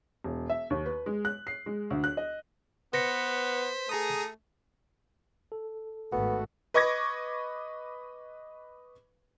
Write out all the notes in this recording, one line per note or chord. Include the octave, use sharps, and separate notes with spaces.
E1
E5
D#2
B4
G#3
F#6
C7
G#3
D2
F#6
D#5
B3 B4 C5 A#6 B6 C#7
A3 G#4 A#5 D#6
A4
G#1 A3 B3 F#4
B4 D#5 C#6 D6 G#6 A#6